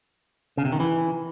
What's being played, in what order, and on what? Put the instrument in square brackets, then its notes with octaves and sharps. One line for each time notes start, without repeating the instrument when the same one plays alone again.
[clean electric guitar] C#3
C3
D#3
E3